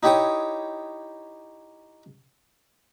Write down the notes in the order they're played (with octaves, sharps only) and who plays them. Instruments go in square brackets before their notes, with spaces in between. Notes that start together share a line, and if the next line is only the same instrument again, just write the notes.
[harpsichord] D#4 E4 G4 C#5 G5 D#6